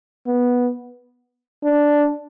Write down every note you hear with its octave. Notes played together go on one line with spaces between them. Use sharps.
B3
D4